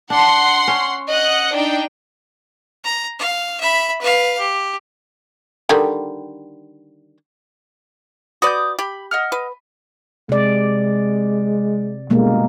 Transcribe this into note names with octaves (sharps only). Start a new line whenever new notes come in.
D4 F#5 C6
C#4
D#5 F#5 F#6
D4 D#4 G5
A#5
F5
E5 B5
B4 F5
G4
D3 D#3 G3
F#4 B4 D5 D#6 G6
G4 B5
D#5 F#5 F6
B4
C3 G#3 D5
G1 B2 G#3 A#3